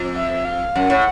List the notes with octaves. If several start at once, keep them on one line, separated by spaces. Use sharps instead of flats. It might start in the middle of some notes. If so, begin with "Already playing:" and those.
Already playing: F2
E5
F5
F#2 F#5
A2